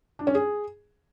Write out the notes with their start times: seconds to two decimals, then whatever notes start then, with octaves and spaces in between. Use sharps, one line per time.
0.19 D4
0.27 C#4
0.35 G#4